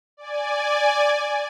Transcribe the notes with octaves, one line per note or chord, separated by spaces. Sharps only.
D5 G#5